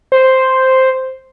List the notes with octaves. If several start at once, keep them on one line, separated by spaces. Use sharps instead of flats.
C5